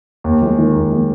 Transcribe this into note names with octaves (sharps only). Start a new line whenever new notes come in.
D#2
G#3
D#3
D#2
G#3